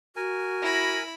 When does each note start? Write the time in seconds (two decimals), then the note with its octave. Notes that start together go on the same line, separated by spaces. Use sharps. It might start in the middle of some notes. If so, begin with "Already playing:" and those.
0.16 F#4 A#4 G#5
0.62 E4 B5 A#6